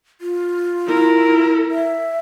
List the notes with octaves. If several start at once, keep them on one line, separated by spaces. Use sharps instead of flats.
F4
E4 A#4
E5